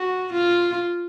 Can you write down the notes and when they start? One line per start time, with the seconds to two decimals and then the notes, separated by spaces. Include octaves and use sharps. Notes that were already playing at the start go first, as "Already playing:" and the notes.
Already playing: F#4
0.33 F4